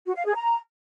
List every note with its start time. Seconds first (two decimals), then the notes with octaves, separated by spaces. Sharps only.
0.07 F#4
0.16 F5
0.25 G#4
0.35 A#5